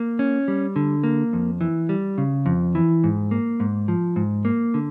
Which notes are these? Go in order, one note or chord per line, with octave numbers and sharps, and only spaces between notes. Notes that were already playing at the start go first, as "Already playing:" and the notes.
Already playing: A#3
C#4
G3
D3
A#3
F2
E3
G3
C#3
F2
E3
G#2
A#3
G#2
F3
G#2
A#3
D3